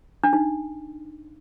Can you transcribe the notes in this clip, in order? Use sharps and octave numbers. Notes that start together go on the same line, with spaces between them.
D4
D#4